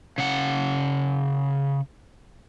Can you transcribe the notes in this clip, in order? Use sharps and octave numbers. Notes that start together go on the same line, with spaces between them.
C#3 F#5